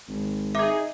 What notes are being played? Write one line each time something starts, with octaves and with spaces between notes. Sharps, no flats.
G#1
D#4 G#4 E5 D6